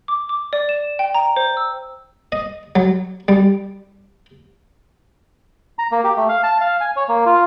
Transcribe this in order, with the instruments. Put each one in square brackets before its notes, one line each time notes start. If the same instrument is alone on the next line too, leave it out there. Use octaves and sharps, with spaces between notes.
[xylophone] D6
D6
D5
E7
G5
A#5
C5
E6
[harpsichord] D#5
F#3
G3
[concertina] A#5
A#3
G4
A3
F5
A5
F5
G#5
C#5
A#3
F4